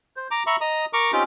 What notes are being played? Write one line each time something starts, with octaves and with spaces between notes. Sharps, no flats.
C5
A#5 D6
E5 A#5 B5 C#6
D#5 A#5 D#6
A#4 A#5 C#6 D6
C4 C#4 D#4 F4 G4 D6